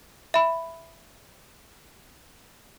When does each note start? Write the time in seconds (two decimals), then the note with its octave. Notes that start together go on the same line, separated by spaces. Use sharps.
0.34 E5 B5